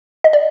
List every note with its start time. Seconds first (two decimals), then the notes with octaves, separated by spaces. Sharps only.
0.24 D#5
0.33 D5